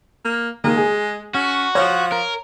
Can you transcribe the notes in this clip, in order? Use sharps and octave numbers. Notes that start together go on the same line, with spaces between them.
A#3
D#3 G#3 A#3 A#4
G#4
C#4 F#4
F3 C#5
A#4